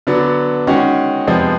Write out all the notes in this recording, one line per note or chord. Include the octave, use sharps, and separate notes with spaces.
D3 F#3 B3 D4
D#3 G#3 C#4 F#4
F2 C3 F3 G#3 B3